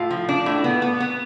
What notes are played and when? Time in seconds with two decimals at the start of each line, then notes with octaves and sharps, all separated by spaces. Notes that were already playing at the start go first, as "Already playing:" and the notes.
Already playing: A2 F4
0.11 F3
0.29 D4
0.46 A2
0.64 B3
0.82 B3
1.00 B3